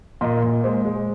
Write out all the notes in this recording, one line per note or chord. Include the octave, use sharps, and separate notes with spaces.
A#2 D#5
A#2
G#3 C5
G#3